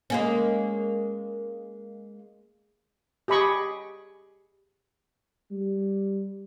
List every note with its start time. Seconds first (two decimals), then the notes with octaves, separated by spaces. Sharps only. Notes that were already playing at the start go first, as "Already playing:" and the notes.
0.10 G#3 A#3 C#4
3.28 G4 G#4 D#5 B5 C#6
5.51 G3